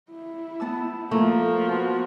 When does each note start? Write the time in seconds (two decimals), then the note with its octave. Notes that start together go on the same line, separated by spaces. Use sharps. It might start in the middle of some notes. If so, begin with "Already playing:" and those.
0.10 E4
0.60 B3 A5 E6
1.11 F3 A3 A#3 A#5
1.64 B3 F#4